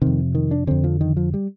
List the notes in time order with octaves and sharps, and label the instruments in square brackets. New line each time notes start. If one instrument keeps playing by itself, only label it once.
[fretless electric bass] F2 C3 D#3
D#3
D4
F2 D3 C4
F3
D#3
F3
G3